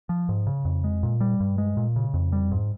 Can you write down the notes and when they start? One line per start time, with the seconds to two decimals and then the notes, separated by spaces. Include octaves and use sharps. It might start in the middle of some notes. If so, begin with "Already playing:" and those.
0.09 F3
0.29 G#2
0.47 C#3
0.65 F2
0.84 G#3
1.03 A#2
1.21 G3
1.40 G2
1.58 G#3
1.77 A#2
1.96 C#3
2.14 F2
2.32 G3
2.52 G#2